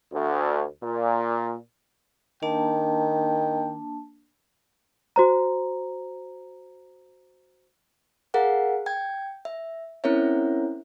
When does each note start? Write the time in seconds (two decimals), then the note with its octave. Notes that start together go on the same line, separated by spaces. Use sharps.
0.12 D2
0.83 A#2
2.43 D#3 A#3 D4 G5 A5
5.16 F#4 C5 A#5
8.34 G#4 A#4 F5 F#5
8.86 G5 G#6
9.45 E5
10.04 C4 C#4 E4 A#4 C#5 E5